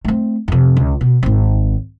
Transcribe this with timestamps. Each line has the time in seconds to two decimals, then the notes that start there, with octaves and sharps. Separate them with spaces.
0.05 A3 C4
0.48 F2 C3
0.77 C#2
1.01 B2
1.23 G#1 C4